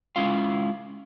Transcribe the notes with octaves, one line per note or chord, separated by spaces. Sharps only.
G#3 C#4 E4 F4 F5